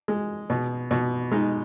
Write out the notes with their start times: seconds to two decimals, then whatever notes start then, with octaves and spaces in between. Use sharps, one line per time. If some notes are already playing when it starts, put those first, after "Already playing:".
0.08 G#3
0.50 B2
0.91 B2
1.31 G#3 D#4